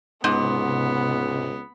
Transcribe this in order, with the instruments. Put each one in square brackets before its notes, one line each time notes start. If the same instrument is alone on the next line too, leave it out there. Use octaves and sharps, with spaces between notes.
[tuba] C#2 [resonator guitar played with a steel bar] G#2 [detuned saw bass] C3 [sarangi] B3